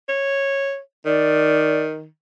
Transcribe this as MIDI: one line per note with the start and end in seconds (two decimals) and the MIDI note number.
0.09 0.79 73
1.06 2.07 51
1.06 1.81 74